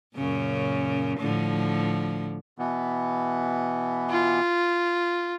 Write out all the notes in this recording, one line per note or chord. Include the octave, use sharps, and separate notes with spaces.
F#2 A#2 C#3
A2 D3 F3
B2 E3 B3
F4